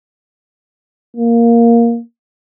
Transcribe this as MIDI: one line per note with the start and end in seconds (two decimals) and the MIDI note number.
1.16 1.99 58